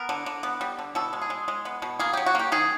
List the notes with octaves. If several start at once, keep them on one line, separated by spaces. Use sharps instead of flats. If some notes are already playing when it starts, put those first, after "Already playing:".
Already playing: B3 A#4
D3
D3
B3
G3
D3
B2 A4
G#3
G#4
G#3
G#3
B3
B2
A#3 G#4
F#3 G4
F#4
A#3 G4
D#3 G#4